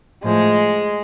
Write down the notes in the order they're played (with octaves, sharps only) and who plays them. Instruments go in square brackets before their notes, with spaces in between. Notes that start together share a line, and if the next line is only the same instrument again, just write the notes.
[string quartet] A2 F3 G#3